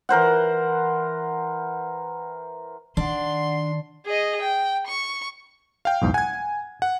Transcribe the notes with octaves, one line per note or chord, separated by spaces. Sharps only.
E3 A#4 C5 F#5
D#3 D4 D5 F#5 C6
G#4 D#5
G5
C#6
F5 G5
B1 E2 G#2
F#5 G#5 G#6
F#5